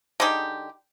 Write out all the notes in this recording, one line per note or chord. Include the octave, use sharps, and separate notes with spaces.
D3 G#3 D#4 G4